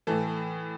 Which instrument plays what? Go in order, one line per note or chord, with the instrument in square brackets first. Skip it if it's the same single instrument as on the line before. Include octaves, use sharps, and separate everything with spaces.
[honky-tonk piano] A2 E3 A4